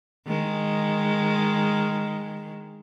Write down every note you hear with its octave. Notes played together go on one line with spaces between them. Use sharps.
D#3 G#3